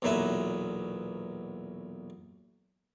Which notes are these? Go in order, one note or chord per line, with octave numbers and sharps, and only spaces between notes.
B1 E2 A#2 F#3 B4 E5